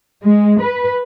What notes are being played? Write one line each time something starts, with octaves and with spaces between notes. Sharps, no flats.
G#3
B4